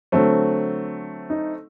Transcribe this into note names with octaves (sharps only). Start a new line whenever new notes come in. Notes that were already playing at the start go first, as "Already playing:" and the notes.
D3 F#3 A3 C4
D#4